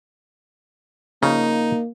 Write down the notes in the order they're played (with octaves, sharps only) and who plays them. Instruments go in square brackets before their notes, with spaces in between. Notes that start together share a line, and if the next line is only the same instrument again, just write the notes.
[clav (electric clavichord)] C#3 F3 [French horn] A#3 [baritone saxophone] D#4